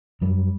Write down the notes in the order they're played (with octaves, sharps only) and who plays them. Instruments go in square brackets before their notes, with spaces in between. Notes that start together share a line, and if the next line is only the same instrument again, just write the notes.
[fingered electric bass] F#2 G3